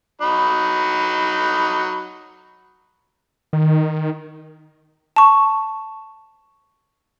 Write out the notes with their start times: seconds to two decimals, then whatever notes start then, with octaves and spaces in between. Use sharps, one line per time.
0.21 F#3 D#4 B5
3.53 D#3
5.16 A5 C#6